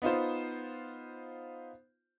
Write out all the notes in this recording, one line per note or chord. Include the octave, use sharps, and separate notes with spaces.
B3 D#4 F4 C5